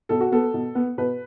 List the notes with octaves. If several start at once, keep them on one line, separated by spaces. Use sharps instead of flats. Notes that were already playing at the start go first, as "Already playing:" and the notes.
B2 A4
F#4
B3 A4
B2
B3
B2 B4